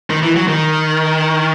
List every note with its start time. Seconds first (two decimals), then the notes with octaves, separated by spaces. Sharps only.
0.10 D#3
0.23 E3
0.36 F#3
0.48 D#3